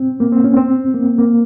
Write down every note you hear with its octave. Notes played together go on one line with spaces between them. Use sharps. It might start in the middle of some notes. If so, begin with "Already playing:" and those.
Already playing: C4
A#3
C4
C#4
C4
A#3
A#3